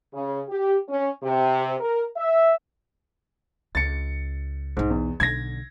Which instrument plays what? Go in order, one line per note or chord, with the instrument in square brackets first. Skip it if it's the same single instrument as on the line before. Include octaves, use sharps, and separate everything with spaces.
[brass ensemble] C#3
G4
C#4
C3
A#4
E5
[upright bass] C#2 [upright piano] A6 C#7
[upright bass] B1 D#4 [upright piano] G#2
[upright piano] E2
[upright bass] B1 D3 [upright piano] G#6 A#6